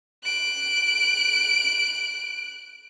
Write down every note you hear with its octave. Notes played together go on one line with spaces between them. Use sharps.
F#6 D7